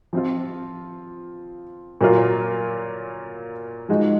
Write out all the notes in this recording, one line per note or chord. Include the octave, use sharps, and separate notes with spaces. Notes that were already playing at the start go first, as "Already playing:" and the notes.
F3 C4 F4
A#2 F#3 A#3 F4
F3 G#3 D#4 F#4